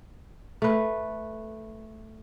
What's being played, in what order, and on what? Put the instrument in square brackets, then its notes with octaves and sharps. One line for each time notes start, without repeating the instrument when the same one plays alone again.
[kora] A3 B4